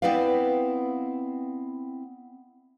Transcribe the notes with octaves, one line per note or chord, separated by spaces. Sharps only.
B3 C4 E4 B4 D5 F5